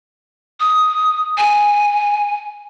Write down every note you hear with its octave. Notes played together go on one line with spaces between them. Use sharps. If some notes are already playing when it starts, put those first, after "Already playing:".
D#6
G#5